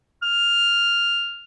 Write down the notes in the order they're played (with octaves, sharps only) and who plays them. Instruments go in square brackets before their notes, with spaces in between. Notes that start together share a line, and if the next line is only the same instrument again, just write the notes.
[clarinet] F6